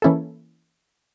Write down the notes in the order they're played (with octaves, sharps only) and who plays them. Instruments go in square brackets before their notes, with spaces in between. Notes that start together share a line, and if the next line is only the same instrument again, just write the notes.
[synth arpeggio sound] E3 A#3 C#4 E4 A4